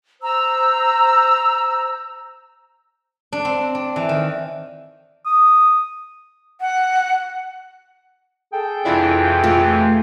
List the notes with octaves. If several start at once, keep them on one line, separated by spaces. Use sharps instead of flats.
C5 A#5 E6
D4
C4
D4
E3
D#3
D#6
F#5
G#4 A4 G5
F2 C3 E3 D4 E4 F4
A3 F4